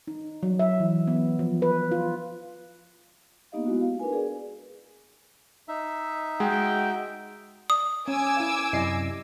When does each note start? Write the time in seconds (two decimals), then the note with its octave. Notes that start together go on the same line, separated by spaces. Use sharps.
0.08 D#4
0.43 F#3
0.59 E5
0.80 E3
1.07 B3
1.39 F3
1.62 B4
1.92 F4
3.52 A#3 B3 D#4 G4 D#5 F5
3.66 G#3 B3 E4 F#4
3.81 F5
3.99 D4 A#4 B4 G#5
4.13 G#4 D5
5.68 D#4 E5
6.40 G#3 F#4 G5
7.70 D5 D#6
8.08 C#4 G#5 D6 E6
8.37 E4 F5
8.73 F#2 C3 E4 D5 D#5 C7